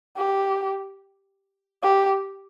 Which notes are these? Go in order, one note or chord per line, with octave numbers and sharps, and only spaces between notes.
G4
G4